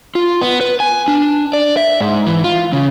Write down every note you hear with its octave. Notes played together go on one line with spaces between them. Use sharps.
F4
B3
B4
G#5
D4
D5
E5
G#2
E3
F4
C#3